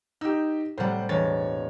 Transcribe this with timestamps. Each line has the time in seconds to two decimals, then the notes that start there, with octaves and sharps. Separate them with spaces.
0.21 D#4 G4 E6
0.78 A2 C3 G3 C5 F#5
1.09 E1 C#5 A6